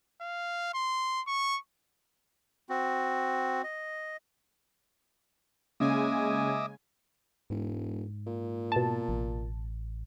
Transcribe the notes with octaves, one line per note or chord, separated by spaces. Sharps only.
F5
C6
C#6
C4 F#4
D#5
C#3 G#3 A#3 C#4 D#5 E5 G#5 D6
E1 G#2
A#2
B2 A5
A1